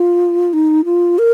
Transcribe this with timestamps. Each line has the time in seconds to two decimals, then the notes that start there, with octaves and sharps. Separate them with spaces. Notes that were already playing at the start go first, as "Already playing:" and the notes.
Already playing: F4
0.53 D#4
0.85 F4
1.19 A#4